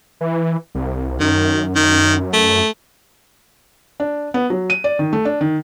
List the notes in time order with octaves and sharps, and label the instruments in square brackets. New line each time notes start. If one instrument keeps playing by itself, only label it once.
[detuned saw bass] E3
C2
[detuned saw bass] F#2 [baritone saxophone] D#3
[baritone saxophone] D#3
A3
[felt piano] D4
B3
F#3
D#7
D5
D#3
A3
D4
D#3